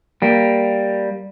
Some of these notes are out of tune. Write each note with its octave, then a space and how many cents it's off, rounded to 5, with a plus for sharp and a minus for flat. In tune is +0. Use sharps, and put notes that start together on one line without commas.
G3 +0 A#3 +0